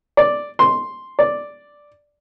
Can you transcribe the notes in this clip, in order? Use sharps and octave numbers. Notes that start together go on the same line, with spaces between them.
D5
C6
D5